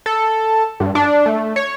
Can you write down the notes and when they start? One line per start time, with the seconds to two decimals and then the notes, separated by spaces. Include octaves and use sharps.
0.06 A4
0.80 G2
0.95 D4
1.26 A3
1.56 C#5